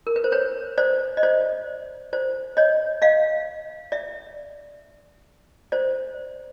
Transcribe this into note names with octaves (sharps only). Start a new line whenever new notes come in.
A#4
B4
C5
B4 C#5
C5 D5
D#5
C5 D5
C5 D5
C#5 D#5
D#5 F5
D5 E5
C5 D5